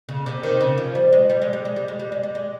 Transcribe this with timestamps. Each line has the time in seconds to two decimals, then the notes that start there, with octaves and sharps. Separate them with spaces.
0.09 C#3
0.26 C3
0.43 D#3
0.61 C#3
0.78 F3
0.95 G3
1.13 G#3
1.30 G3
1.42 G#3
1.53 G3
1.65 G#3
1.76 G3
1.88 G#3
1.99 G3
2.12 G#3
2.23 G3
2.35 G#3